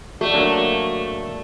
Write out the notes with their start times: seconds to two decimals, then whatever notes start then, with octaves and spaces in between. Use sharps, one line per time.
0.21 A3 F#4 D5
0.34 F#3 A#3 D4